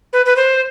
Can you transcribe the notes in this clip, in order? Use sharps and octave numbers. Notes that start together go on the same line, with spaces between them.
B4
B4
C5